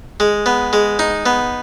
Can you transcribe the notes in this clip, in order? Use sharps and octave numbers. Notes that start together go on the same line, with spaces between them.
G#3
B3
G#3
D#4
B3